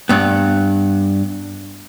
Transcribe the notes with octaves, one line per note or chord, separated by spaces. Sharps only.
G2 B3